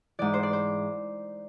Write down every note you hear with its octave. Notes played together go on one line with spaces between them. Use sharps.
G#2 E3 D5
C5
D5
C5